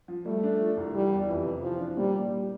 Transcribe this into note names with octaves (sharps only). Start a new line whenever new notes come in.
F3
G3 A3
D4
F3
C2
E3 G3
E2
F2 E3
C3
E3 F3
D4
A#2 G3
A#2
G3